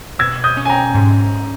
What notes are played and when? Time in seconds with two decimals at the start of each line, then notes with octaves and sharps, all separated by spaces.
0.19 B2 E6 G#6
0.44 D#6 G6
0.57 C#4
0.65 G#5
0.70 G5 A#5
0.94 G#2